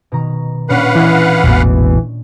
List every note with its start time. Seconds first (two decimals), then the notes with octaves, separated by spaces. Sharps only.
0.12 B2 D#3 A#5
0.69 A#2 C#4 D4 B4 F5 F#5
0.95 E3 D#5 G#5 C6
1.44 E1 A1 B2